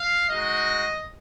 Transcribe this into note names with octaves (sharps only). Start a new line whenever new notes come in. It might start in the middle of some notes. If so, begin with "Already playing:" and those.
Already playing: F5
G#3 D#4 F#4 D#5